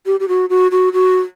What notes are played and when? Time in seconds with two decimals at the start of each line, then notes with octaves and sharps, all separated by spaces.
0.06 G4
0.20 G4
0.28 F#4
0.50 F#4
0.71 F#4
0.93 F#4